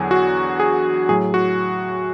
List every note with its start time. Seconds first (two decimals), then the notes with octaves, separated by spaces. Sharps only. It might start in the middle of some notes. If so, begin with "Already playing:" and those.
Already playing: E2 D3 F#3 G#4
0.11 F#4
0.60 G#4
1.09 A2 F#3 G#4
1.34 F#4